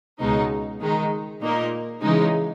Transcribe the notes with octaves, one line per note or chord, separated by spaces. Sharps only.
C#2 B2 G#3 D#4
D#3 G#3 D#4
A#2 A#3 D#4 A#4
C#3 E3 G#3 D#4